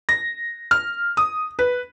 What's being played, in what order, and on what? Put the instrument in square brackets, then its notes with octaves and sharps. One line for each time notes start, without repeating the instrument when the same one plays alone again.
[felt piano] A#6
F6
D#6
B4